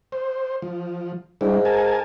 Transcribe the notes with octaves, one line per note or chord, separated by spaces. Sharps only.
C5
F3
G#2 G3 D4 E4
A#4 G#5 A5